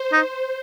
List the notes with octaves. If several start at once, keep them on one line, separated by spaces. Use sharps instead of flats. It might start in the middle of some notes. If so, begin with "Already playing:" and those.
Already playing: C5
D#4